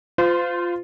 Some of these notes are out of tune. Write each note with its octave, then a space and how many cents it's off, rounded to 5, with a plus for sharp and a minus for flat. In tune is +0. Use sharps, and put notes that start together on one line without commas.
F4 +0 C5 -35